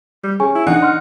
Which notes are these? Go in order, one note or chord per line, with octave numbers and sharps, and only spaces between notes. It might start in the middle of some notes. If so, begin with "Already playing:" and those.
G3
C#4 G#4 G#5 C#6
E4
E3 D4 D#4 F#5
D5 C6 F6